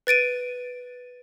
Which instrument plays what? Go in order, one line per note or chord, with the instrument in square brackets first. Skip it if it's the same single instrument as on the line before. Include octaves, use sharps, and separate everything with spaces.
[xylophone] B4 A6 D7 D#7